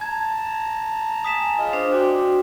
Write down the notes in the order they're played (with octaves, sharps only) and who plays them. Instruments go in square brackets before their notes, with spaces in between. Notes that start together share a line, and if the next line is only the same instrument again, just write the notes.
[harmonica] A5 A#5 [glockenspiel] G#6
[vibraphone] G#5 [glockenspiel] D#6 B6 E7
[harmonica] F4 G#4 D#5
[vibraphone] D4 C5
[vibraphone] F#4 [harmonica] C5 D5 G5